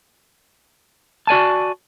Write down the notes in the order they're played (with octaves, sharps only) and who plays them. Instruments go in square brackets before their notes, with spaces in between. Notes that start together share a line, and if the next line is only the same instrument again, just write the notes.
[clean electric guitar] F#4 D5 G#5 A5